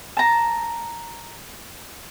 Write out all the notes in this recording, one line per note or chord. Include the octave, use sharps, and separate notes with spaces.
A5 A#5